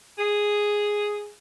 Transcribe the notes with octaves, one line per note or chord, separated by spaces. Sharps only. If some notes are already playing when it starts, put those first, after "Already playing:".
G#4